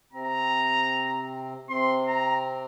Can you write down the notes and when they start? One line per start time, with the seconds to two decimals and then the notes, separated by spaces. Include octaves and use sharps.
0.13 C3 C4 A#5
1.69 C3 C4 C6
2.08 A#5